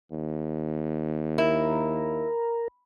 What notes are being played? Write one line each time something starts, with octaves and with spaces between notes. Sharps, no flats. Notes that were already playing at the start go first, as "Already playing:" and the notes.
D#2
E4 A#4